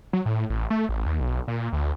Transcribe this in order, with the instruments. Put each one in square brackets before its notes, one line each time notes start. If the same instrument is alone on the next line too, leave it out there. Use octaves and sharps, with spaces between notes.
[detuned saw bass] F#3
A2
A1
A3
A1
D#2
B1
A#2
D2